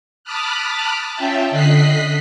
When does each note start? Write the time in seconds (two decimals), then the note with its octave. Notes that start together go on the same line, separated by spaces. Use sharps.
0.24 A5 B5 D6 D#6 F6 F#6
1.14 C#4 F4 E5 G5 A5
1.51 D3 D#5 F#6 B6 C7